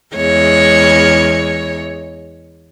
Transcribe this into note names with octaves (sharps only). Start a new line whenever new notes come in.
E2 G#3 C#5